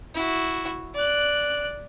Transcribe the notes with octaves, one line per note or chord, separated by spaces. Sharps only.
E4 F#4
D5 F#6